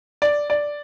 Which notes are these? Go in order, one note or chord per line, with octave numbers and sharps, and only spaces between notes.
D5
D5